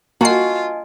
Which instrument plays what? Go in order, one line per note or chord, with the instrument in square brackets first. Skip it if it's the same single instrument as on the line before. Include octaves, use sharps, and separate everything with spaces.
[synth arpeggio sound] A#3 C7 [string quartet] F4 [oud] F#4 [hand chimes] D#5 G#5 A5